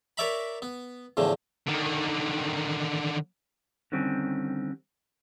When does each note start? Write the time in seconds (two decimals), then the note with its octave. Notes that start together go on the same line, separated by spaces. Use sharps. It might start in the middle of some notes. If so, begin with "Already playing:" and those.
0.17 A#4 C#5 D5 E5 A#5 B5
0.62 B3
1.17 E2 A2 D3 F3
1.67 D3 D#3
3.92 D3 D#3 G3 C4 C#4